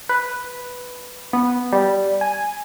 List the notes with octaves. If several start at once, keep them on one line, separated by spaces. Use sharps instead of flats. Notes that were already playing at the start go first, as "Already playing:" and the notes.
B4
B3
G3
G#5